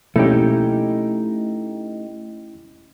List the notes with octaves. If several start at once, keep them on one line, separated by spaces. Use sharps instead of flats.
B2 F3 A3 A#3 C#4 D#4 E4 G4